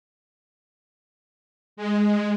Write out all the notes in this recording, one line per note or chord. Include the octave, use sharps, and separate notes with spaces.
G#3